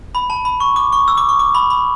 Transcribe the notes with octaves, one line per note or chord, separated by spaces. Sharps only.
B5
A5
B5
C#6
D6
C#6
E6
D6
C#6
D6
B5
B5